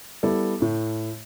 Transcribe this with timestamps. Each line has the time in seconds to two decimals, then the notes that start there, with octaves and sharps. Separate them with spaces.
0.23 G3 B3 E4 A4
0.60 A2 A3